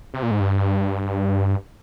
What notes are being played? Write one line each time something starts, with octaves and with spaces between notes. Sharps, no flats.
C3
A#2
G#2
G2